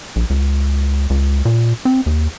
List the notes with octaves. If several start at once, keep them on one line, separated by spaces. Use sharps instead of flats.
A#1
C#2
C#2
A#2
C4
D#2